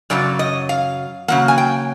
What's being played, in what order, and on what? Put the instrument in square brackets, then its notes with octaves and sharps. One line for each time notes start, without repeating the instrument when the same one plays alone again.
[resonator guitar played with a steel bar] F#2 C#3 F#3 D5
D#5
F5
C#3 F#3 A#3 F#5
G#5
G5